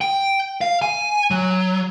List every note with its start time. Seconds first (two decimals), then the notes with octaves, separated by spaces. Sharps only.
0.01 G5
0.61 F5
0.82 G#5
1.31 F#3